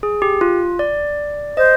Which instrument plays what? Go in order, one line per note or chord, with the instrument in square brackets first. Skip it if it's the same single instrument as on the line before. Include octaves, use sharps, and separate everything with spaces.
[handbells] G#4
G4
F4
D5
[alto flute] C5 [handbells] D#5